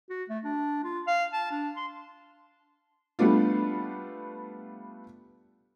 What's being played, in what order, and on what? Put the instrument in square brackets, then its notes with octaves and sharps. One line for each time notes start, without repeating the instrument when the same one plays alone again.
[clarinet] F#4
A3
D4
F4
F5
A5
D4
C6
[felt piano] G3 A3 B3 D4 F4